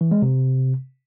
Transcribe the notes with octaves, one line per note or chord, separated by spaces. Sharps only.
E3
G#3
C3